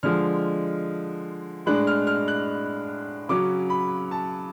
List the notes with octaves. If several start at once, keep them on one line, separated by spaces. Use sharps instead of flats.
D3 F3 G#3 F6
A2 G#3 D4 F#6
F6
F6
F#6
C#3 F#3 C#4 D6
B5
A5